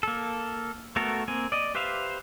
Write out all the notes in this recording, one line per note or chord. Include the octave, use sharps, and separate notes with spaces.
A#3 A4
A3 B3 F#4 A4 A#4
A#3 C4 G#5
D5 D#5
G4 B4 C5 E5 F5